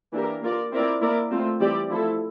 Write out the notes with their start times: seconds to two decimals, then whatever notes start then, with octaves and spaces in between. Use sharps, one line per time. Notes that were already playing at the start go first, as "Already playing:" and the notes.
0.12 E3 A#3 D4 G4 A#4
0.41 A#3 F4 A#4 D5
0.71 C4 E4 A#4 D5
1.00 A#3 E4 A#4 D5
1.30 A3 C4 F4
1.60 E3 G3 C4 G4 D5
1.89 F3 A3 E4 A4